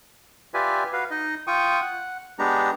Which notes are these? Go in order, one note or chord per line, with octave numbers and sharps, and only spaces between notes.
F4 G4 B4 D5 E5 G#5
F#4 B4 F5
D#4 D#5
F4 G5 C#6 D#6
F#5
G#3 B3 D4 G4 A#5